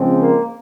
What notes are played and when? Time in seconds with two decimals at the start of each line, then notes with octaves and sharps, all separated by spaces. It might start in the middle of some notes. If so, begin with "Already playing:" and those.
Already playing: C#3 F3 G#3 C4
0.21 A#3